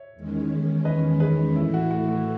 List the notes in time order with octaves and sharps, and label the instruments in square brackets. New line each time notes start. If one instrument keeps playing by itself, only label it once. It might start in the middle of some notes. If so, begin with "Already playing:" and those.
Already playing: [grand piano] C#5 E5
[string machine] E2 D#3 G#3 C#4
[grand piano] B4 D#5
G#4 B4
[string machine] A2 E3 A3 [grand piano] E4
[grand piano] F#4
F#4
F#4